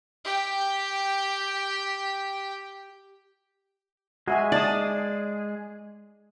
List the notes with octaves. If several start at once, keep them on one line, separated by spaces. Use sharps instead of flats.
G4 G5
G#3 F#4 G#4 E5 G#5
D#4 D5 A5 D#6